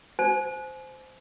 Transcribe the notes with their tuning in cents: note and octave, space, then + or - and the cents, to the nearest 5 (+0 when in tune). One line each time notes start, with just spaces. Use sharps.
C5 -10 G#5 +35